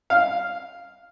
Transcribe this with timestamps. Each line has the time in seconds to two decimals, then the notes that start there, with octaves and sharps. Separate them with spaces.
0.10 F5